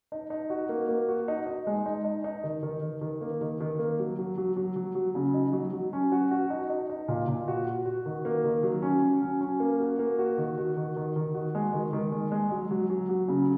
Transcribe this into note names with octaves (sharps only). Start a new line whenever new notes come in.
D#4
D#4
F#4
A#3
A#3
F#4
D#4
D#4
G#3
D#4
D#4
D#4
D#3
D#3
D#3
D#3
A#3
D#3
D#3
A#3
F#3
F#3
F#3
F#3
F#3
F#3
C#3
D#4
F#3
F#3
C#4
F#4
F#4
D#4
D#4
D#4
A#2
A#2
F#4
F#4
F#4
D#3
A#3
D#3
F#3
C#4
F#3
C#4
C#4
A#3
F#4
A#3
F#4
D#3
F#4
D#3
D#3
D#3
F#4
G#3
D#3
D#3
G#3
G#3
F#3
F#3
F#3
F#3
C#3